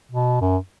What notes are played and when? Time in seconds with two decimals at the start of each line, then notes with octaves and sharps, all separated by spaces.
0.11 B2
0.41 F#2